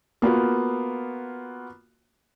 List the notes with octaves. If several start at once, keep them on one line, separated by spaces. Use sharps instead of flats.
A#3 B3 F4 F#4